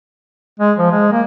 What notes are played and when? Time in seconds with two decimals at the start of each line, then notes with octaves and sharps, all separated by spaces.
0.60 G#3
0.78 F3
0.91 G#3
1.12 A#3